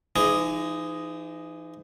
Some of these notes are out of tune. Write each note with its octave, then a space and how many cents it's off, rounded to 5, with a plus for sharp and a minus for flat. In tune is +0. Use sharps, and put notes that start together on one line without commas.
E3 +45 D#4 +0 G#4 +0